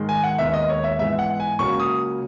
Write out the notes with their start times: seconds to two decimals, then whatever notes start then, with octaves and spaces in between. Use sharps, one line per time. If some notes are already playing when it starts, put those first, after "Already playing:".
Already playing: G#2 D#3 G#3
0.09 G#5
0.24 F#5
0.39 D#2 D#3 G#3 B3 E5
0.54 D#5
0.69 C#5
0.84 E5
0.99 G#2 E3 G#3 B3 E5
1.19 F#5
1.40 G#5
1.59 C#2 C#3 F#3 A#3 C#6
1.80 D#6